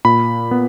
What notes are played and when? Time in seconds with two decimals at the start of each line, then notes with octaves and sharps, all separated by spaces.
0.05 A#2 B5
0.51 B3